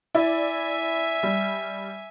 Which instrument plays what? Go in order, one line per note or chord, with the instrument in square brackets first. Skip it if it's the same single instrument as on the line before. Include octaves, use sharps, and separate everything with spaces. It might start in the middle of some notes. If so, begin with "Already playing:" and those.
[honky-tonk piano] E4 D5 [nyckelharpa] E5 G#5
[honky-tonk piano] G3